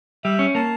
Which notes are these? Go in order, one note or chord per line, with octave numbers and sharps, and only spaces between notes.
G3 E5
C#4
A#3 A5